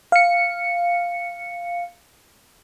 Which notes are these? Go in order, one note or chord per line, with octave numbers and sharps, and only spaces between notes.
F5 C#7